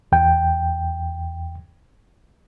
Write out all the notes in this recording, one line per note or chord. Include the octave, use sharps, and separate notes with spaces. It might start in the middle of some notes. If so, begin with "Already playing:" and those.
E2 G5